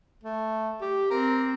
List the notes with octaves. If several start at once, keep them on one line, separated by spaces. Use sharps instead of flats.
A3
G4
C4 A#4